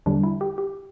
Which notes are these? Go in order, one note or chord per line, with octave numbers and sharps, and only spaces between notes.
E2 D3 G3 D4
E4
G4
G4